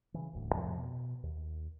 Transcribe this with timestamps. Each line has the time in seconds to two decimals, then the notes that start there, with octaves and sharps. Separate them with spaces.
0.14 C#3 E3
0.33 D#1 D2 A2
0.54 F2 A2 C3 F3
0.78 B2
1.23 D#2